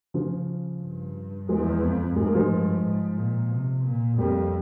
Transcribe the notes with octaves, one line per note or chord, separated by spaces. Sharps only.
C#3 F3
G2
E2 F3 G#3
F2
G#2 G#3
A#3
F3 G#3
G2
G#2
A#2
C3
A#2
F2 G3 A#3